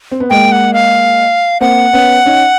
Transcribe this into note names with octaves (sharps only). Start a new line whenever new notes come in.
C4
B3
G#3 A#3 G5
F#5
F5
A#3 C4 F#5
B3 C#4
C#4 D#4